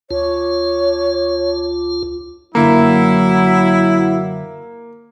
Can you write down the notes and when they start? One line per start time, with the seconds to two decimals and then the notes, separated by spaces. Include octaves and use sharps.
0.11 D2 F4 C#5
2.55 F#2 D3 F#3 A#3 E4 A#5